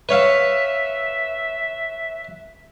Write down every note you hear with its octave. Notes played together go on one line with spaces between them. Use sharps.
B4 C#5 E5 F5